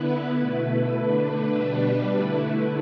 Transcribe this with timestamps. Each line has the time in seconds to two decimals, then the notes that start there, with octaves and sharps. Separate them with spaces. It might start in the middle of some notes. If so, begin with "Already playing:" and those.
Already playing: D3 B3 E4 B4
0.39 B2 A3 E4
0.97 D3 A3 D4 B4
1.55 B2 G3 D4 B4
2.13 D3 A3 E4